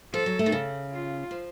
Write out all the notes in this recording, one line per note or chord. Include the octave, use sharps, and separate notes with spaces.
F3 A4
F#3
A3
D#3
C#3
F4
F3